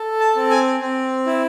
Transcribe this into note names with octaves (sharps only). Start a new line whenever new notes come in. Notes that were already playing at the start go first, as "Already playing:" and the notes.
Already playing: A4
A5
C4
G#5
C4
E4